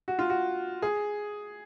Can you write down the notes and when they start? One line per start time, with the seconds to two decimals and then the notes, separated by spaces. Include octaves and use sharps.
0.08 F#4
0.19 F4
0.30 F#4
0.82 G#4